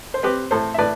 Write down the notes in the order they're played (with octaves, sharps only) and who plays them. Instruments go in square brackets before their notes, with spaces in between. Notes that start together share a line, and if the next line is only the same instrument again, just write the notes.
[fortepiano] C5
C4 G4 B4
A2 A4 C5
E5
A2 B4 D5